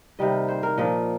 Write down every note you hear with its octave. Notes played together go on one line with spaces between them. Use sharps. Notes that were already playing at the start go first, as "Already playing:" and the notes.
C3 D#3 G3 A#3 D#5
C5
A#4
A#2 F3 A#3 D#5